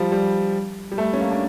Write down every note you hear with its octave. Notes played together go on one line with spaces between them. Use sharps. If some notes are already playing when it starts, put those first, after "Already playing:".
Already playing: F3 G3
G3
G3
A3
C#4
A#3
D4